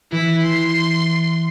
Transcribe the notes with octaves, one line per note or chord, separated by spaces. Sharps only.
E3 E4 B6
C6